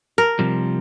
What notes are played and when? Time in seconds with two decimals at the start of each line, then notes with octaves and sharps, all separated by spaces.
0.18 A#4
0.39 C3 F3 G3